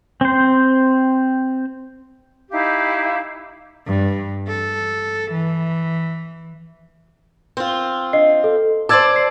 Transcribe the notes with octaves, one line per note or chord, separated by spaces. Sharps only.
C4 C5
D#4 E4 G4 F5
G2
A4
E3
C4 F4
D4 D#5 C7
A4
C5 D5 A5 D6 E6 G#6
C7